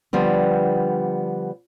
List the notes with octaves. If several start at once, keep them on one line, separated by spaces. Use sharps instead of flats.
D3 F3 G3 B3